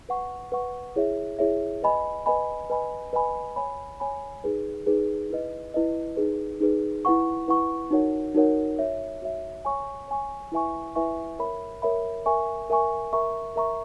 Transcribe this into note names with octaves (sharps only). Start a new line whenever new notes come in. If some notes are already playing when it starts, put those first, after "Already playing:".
B4 F#5 C#6
B4 F#5 C#6
E4 G#4 C#5 E5
E4 G#4 C#5 E5
B4 D#5 G#5 B5
B4 D#5 G#5 B5
B4 D#5 G#5 B5
B4 D#5 G#5 B5
C#5 G#5 B5
C#5 G#5 B5
D#4 G#4 B4
D#4 G#4 B4
E4 B4 D#5
E4 B4 D#5
D#4 G#4 B4
D#4 G#4 B4
E4 B4 F#5 C#6
E4 B4 F#5 C#6
D#4 F#4 A#4 C#5 F#5
D#4 F#4 A#4 C#5 F#5
F#4 C#5 E5
F#4 C#5 E5
C#5 G#5 C#6
C#5 G#5 C#6
E4 B4 E5 G#5 C#6
E4 B4 E5 G#5 C#6
A#4 C#5 E5 B5
A#4 C#5 E5 B5
A#4 E5 G#5 C#6
A#4 E5 G#5 C#6
A#4 E5 A#5 C#6
A#4 E5 A#5 C#6